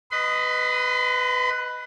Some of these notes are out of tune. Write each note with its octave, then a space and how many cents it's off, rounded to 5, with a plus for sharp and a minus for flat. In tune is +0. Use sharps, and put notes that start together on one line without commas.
B4 +10 D#5 +0 C6 -45